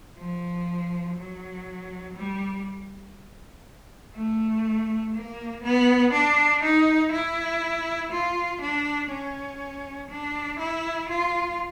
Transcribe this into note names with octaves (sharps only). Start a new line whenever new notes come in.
F3
F#3
G3
A3
A#3
B3
D4
D#4
E4
F4
D4
C#4
D4
E4
F4